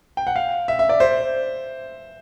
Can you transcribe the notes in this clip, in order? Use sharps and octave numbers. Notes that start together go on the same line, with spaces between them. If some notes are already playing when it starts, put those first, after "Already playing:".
G5
F#5
F5
E5
E5
D5
C5